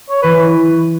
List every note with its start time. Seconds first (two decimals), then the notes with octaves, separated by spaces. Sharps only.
0.10 C#5
0.22 E3 B4